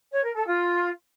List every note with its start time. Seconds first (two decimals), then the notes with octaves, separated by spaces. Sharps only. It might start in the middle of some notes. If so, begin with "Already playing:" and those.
0.11 C#5
0.23 A#4
0.34 A4
0.45 F4